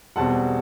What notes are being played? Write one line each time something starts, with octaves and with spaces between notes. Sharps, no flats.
E1 E2 B2 G3 C4 F#5 A5